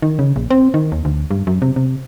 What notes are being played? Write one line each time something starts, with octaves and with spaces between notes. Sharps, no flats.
D#3
C#3
A#1
C4
D#3
D#2
D2
G2
F#2
C3
C3